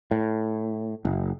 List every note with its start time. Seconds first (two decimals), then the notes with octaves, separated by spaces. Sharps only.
0.11 A2
1.05 F#1